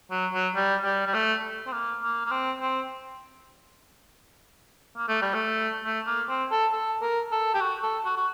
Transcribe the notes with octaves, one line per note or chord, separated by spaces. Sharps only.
F#3
F#3
G3
G3
G3
A3
C4
A#3
A#3
A#3
C4
C4
A#3
A3
G3
A3
A3
A#3
C4
A4
A4
A#4
A4
G4
F#4
A4
F#4
F#4